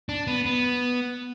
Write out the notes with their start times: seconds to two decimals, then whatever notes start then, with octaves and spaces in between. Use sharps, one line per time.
0.09 D4
0.27 B3
0.46 B3